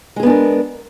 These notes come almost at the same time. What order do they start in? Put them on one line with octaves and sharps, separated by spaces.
G#3 G#4 B3 D4 A#4